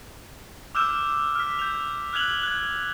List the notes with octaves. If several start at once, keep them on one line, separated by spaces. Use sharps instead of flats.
D6 E6 F6 G6 E7
F6 B6
G6 F7
F6 F#6 G#6 F7 F#7
F#6 G#6